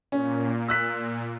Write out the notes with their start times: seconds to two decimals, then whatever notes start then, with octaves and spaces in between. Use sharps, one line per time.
0.12 A#2 C#4
0.68 E6 F#6 B6